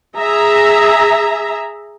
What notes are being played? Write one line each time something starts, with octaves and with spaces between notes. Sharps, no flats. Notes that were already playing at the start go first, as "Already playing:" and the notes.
G#4 E5 A#5